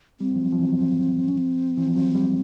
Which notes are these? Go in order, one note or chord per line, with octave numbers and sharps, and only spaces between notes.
G3 C4
F3
F#3
F3
E3
F#3
F3
C#4
C4
E3
F3
F#3
G3